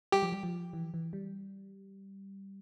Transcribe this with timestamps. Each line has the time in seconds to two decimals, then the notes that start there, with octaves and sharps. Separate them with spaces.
0.12 G3 G4
0.22 F3
0.32 G3
0.43 F3
0.73 E3
0.94 E3
1.13 G3